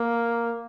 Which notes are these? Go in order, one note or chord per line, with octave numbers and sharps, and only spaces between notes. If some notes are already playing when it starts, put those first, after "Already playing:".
Already playing: A#3